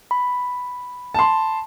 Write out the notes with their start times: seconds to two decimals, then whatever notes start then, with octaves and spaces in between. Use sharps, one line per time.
0.11 B5
1.15 A5 C6